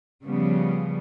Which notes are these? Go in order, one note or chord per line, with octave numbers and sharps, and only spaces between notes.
C#3 F3 G3 B3